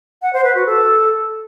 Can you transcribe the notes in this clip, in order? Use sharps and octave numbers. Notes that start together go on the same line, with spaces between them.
F#5
C5
B4
F#4
A4